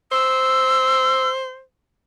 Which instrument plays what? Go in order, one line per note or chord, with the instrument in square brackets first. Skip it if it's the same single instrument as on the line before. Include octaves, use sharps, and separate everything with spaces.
[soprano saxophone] C5 [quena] E6